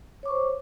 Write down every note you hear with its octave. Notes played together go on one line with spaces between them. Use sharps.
C5 C#5 C#6 D6